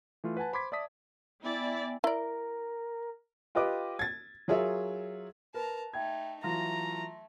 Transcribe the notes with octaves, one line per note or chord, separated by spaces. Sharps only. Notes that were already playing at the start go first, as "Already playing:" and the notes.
E3 A3 F4
B4 F#5 G#5 A5
C5 B5 C6 D6 G#6 B6
D5 E5 A5 D#6 B6
B3 E4 D5 G5 G#5
E4 A#4 D5
F4 G4 B4 D#5 D6
G#6 A6
F#3 F4 G#4 A#4 C#5 E5
A#4 B4 A5 A#5
A3 D#4 E5 G5 B5 G#6
E3 F#3 A3 F4 A#5 C6 A#6